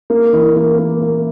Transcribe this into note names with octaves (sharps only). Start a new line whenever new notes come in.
A#3
E3
A#3
A#3
A#3